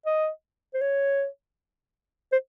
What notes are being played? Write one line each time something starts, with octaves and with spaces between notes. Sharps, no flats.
D#5
C5
C#5
C5